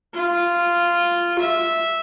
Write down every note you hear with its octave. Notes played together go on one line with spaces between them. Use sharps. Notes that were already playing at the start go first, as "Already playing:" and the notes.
F4
E5